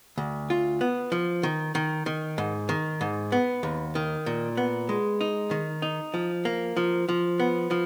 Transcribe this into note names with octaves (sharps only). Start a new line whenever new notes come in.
D2
F4
B3
F3
D#3
D#3
D#3
G#2
D#3
G#2
B3
D#2
D#3
A#2
B3
G#3
D#4
D#3
D#4
F3
A#3
F3
F3
B3
F3